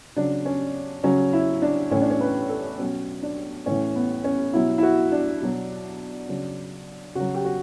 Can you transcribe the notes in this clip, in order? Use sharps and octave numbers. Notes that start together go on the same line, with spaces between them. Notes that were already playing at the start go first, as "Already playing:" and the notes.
C#3 F#3 D4
C#4
C#3 F#3 C#4
E4
D4
A2 E3 C#4
D4
C#4
B4
A4
B2 F#3 C#4
D4
A2 E3 C#4
B3
C#4
B2 F#3 E4
E4
F#4
D4
B2 F#3
C#3 F#3
C#3 F#3 F#4
G4
F#4